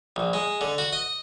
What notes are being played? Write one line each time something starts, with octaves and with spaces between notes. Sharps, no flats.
A#1
G#3
D3
F#4
D#5